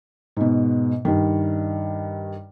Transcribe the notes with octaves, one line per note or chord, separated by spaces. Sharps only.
G#2 B2
G2 D#3